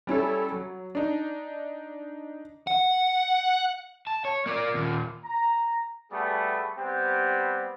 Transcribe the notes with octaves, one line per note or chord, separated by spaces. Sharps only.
G3 C#4 E4 A4
F#3
D4 D#4
F#5
A5
C#5
A#3 D5
D#2 A#2
A#5
G3 A3 B3 G#4
G3 B3 C4 G4